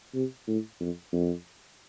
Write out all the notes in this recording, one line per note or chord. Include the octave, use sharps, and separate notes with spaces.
C3
A2
F2
F2